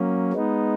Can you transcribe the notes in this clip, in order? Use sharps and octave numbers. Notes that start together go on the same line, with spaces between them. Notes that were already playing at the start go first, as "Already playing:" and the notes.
Already playing: F#3 A#3 C#4
G#3 B3 D#4